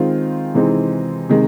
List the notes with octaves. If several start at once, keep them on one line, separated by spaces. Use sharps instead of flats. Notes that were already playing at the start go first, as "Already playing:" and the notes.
Already playing: D#3 G#3 C4 F4
C3 E3 G#3 C4 D#4
C3 D#3 G#3